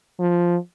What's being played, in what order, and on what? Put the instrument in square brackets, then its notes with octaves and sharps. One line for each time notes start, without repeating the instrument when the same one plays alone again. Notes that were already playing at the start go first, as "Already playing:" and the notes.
[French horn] F3